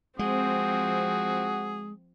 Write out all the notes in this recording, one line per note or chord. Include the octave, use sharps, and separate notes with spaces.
F3 G#3 C4 F#4 G#4